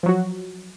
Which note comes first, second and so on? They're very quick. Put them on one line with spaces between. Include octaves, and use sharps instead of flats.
F3 F#3 F#4